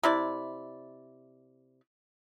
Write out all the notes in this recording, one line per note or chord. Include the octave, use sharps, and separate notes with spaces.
C3 E4 D5